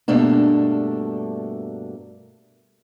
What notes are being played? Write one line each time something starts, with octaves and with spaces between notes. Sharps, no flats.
G2 B2 A3 A#3 D4